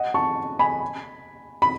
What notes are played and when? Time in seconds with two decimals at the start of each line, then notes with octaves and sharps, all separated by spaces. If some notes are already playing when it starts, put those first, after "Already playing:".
Already playing: D#5 F#5
0.14 A5 C#6
0.59 G#5 B5
1.62 B5